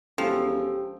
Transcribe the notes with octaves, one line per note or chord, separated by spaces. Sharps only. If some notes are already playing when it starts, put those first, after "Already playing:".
E1 F3 C#4 G4 A4 G5